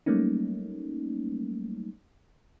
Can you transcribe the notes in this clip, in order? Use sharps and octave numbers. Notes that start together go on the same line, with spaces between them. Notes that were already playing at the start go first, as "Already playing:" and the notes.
F#3 G3 A3 A#3 C#4 D#4